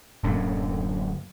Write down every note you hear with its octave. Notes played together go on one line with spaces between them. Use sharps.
D1 F#2 D3 A#3